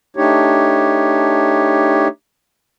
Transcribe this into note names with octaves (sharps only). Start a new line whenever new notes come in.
A3 D4 D#4 G4 C#5